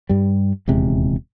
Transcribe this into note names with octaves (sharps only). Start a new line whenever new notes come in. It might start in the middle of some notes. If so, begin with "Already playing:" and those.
G2 G3
D#1 E2 C3 G#3